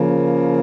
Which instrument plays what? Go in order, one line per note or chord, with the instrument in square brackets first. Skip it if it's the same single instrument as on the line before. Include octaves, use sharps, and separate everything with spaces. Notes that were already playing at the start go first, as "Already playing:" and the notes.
Already playing: [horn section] C#3 F3 A#3